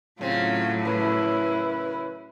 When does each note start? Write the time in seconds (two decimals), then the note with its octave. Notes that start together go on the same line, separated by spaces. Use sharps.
0.21 A2 C#3 F#3 C4 F4
0.85 F#2 C#3 E4 B4